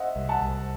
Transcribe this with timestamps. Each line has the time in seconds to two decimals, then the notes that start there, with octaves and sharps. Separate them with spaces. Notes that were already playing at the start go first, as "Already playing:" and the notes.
Already playing: C5 D#5 E5 F#5
0.16 C2
0.29 F#5 A5
0.41 C2